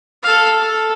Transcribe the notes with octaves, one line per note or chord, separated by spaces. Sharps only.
A4 F5
A4